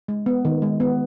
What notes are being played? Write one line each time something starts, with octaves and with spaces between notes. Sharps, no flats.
G#3
B3
D#3
G#3
B3